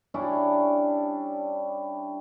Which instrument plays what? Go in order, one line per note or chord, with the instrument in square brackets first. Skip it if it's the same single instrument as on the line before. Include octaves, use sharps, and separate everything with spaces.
[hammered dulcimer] G3 C#4 D4 E4